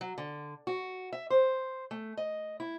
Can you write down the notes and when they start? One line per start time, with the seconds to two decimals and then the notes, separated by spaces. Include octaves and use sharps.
0.01 F#3
0.18 D3
0.67 F#4
1.13 E5
1.30 C5
1.91 A3
2.17 D#5
2.60 E4